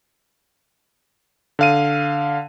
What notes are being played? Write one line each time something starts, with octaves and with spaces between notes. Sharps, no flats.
D3 F5 D#7